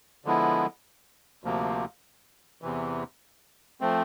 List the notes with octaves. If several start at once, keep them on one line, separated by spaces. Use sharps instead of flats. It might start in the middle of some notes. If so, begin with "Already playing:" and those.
D3 F3 G#3 B3 E4
D2 C3 F3 A#3
E2 C3 E3
F3 A3 C4